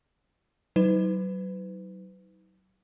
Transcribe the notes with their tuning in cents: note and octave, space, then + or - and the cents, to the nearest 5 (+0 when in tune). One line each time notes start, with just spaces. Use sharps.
F#3 +30 D#4 +45 B4 +30